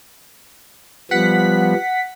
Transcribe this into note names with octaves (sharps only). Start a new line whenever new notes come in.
F3 G3 B3 F#5 B6